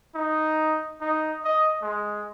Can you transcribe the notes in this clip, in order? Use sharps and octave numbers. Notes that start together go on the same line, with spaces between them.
D#4
D#4
D#5
G#3